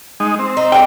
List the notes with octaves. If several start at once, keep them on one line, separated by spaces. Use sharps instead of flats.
G#3 D#4
C4
D#4
G3 G#3 A#3 G5